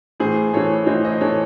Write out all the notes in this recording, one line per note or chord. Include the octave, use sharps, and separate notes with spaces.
A2 E3 G#4 C5
A2 E3 A4 C#5
A2 E3 C5 D#5
C5 D#5
A2 E3 A4 C#5